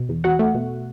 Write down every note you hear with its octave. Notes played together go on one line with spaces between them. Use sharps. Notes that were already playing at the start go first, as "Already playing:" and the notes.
Already playing: B2
E2
E2 F#4 F#5
A3
B2